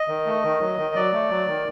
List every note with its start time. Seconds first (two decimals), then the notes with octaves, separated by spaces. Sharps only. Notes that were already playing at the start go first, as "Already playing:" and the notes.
Already playing: D#5
0.08 D#3
0.26 A3
0.43 D#3
0.60 F#3
0.78 D#3
0.95 F#3 D5
1.13 A3
1.30 F#3
1.47 D#3